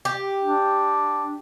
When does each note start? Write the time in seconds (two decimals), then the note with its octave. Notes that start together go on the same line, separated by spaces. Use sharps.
0.05 G4
0.45 D4